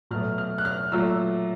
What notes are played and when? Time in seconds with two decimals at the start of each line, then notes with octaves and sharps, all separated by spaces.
0.11 B2 F#3 A3 F6
0.38 F6
0.58 F#6
0.65 F6
0.92 A#2 F#3 A3 E6